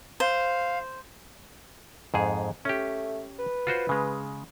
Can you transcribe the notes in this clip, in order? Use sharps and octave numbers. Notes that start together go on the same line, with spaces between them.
C5 F5
F2 G#2 G#4
A3 C#4 G4
B4
F4 F#4 C5
C#3 G#3